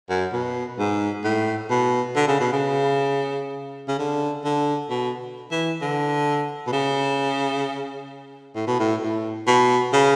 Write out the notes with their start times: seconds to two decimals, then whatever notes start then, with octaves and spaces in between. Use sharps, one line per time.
0.10 F#2
0.33 B2
0.79 G#2
1.24 A2
1.70 B2
2.16 D3
2.28 C#3
2.40 B2
2.53 C#3
3.88 C#3
3.99 D3
4.45 D3
4.90 B2
5.51 E3
5.81 D3
6.67 B2
6.72 C#3
8.56 A2
8.67 B2
8.79 A2
9.02 A2
9.47 B2
9.93 C#3